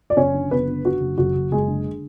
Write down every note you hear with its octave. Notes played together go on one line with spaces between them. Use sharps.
D5
F#1 C#4 C#5
D3
F#1 B3 B4
D3
D3 F#4
F#1
F#1 F#4
F#1
F#1 G#3 G#4
D3